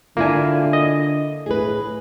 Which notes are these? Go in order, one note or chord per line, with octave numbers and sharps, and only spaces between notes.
D3 A#3 D4 E4 F4 G#5
D#5
A2 G#4 B4